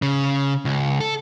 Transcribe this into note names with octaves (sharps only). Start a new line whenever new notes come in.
C#3
C#2
A4